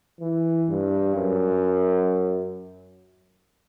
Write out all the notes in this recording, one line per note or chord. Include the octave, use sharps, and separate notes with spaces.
E3
G2
F#2